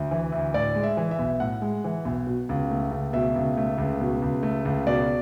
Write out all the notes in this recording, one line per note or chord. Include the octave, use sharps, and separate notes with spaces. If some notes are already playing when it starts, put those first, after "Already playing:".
Already playing: D2
E3
D2
A2 D5
G#3
E5
E3
E5
B1
A2 F#5
G#3
E3
B1
B2
C#2
A3
C#2
B2 E5
C#2
A3
C#2
B2
C#2
A3
C#2
B2 D5